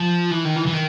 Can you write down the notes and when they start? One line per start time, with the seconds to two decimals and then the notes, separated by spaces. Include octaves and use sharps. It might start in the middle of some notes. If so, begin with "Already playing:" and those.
Already playing: F3
0.31 E3
0.45 D#3
0.56 E3
0.66 E3
0.73 D#3